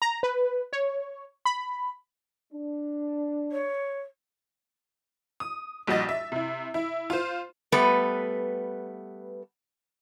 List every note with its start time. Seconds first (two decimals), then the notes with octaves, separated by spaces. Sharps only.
0.02 A#5
0.23 B4
0.73 C#5
1.45 B5
2.53 D4
3.52 C#5
5.40 D#6
5.87 A#1 G3 F#4 D#5 A6
6.09 E5
6.32 C3 E4
6.74 E4
7.10 F4 C5
7.72 G3 A3 B3 B4